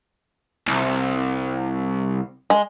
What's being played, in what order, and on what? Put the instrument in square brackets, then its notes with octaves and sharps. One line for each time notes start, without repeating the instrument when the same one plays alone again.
[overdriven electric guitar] C2
[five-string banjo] G#3